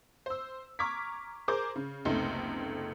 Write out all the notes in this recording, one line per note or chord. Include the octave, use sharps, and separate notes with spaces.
C5 E6
A#5 C#6 D6 F6 G#6 B6
G#4 A#4 C5 A#5 D6 G6
C#3
F#1 C#2 C3 A3 D#4 C6